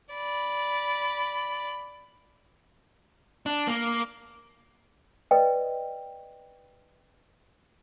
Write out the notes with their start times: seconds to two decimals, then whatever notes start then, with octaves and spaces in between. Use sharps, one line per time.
0.14 D5 B5
3.46 D4
3.67 A#3
5.31 B4 D5 D#5 G5